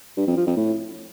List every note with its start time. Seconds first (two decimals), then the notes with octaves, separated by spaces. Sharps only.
0.17 G2
0.27 F2
0.37 F3
0.47 F2
0.57 A2